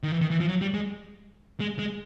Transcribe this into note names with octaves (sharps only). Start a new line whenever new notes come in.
D#3
E3
D#3
E3
F3
F#3
G3
G#3
G#3
G#3